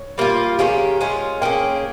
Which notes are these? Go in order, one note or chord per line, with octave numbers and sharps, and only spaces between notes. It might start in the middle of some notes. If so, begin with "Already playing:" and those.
Already playing: C#5
G3 A#3 F4
D#3 G#3 C#4 G4 F5
G#3 C#4 F4
A#3 C#4 G#4 G5